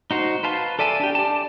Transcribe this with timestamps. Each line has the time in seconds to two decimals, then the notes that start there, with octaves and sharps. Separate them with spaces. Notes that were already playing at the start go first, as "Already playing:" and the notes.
0.11 D#4 F#4 C5
0.43 B4 F5 A5 C6
0.79 A4 D5 E5 G#5 A5
1.00 D4 G4
1.15 D5 A5